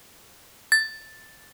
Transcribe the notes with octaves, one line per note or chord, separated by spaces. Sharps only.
A6